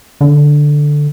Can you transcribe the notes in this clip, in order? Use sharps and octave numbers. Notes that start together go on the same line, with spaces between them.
D3